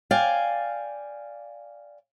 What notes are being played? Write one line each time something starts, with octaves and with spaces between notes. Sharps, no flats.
D5 F5 G5 G#5